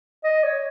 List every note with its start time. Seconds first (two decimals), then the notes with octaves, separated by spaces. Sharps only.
0.24 D#5
0.43 C#5